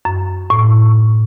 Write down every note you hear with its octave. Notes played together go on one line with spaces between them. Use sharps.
F#2
A2